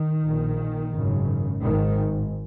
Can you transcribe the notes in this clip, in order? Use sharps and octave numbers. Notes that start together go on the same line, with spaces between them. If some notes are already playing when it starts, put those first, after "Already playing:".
Already playing: D#3
A#1 A#2
G#1 F#2 C#3
G#1 G#2 D#3